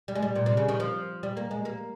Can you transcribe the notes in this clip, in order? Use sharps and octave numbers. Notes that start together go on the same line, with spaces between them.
G3
G#3
G3
A#2
C3
C#3
D#3
F3
G3
A#3
G#3
A#3